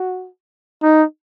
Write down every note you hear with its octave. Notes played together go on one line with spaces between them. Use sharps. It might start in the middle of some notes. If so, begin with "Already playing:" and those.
Already playing: F#4
D#4